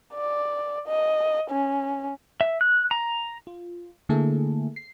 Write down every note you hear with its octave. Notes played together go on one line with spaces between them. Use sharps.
D5
D#5
C#4
E5
F#6
A#5
F4
D3 A3 A#3 E4 G#4 A4
C7